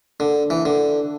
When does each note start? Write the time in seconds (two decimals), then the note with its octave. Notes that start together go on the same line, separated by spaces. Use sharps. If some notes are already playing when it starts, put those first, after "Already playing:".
0.20 D3
0.50 E3
0.65 D3